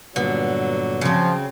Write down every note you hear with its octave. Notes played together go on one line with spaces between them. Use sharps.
G2 A#2 D3 F#3 B3
C#3 F3 C4